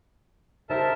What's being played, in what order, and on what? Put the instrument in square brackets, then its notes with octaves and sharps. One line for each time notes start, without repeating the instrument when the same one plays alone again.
[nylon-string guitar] C#3 D#4 C5 [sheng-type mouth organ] A#4 E5 A5